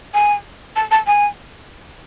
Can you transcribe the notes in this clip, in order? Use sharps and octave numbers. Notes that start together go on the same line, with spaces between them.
G#5
A5
A5
G#5